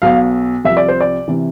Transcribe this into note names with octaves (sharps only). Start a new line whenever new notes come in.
B1 B2 F5
C2 C3 F3 E5
D5
C5
D5
C3 E3